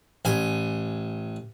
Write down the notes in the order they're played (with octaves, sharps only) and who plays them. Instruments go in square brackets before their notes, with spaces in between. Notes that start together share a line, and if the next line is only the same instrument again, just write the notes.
[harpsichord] A1 G#5